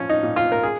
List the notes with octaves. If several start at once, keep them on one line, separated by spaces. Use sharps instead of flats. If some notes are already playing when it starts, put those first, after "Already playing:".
Already playing: A#2 F3 C#4
D#4
A#2
F4
A#4
G#4